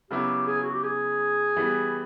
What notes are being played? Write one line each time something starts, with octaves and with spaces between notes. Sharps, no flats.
C#3 F#3 B3 E4 G4
G#4
F#4
G4
G#4
E3 G3 B3